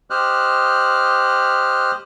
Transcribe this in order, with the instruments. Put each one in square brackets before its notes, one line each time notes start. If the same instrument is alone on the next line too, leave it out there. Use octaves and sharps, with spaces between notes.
[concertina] G4 C5 D#5 F6 F#6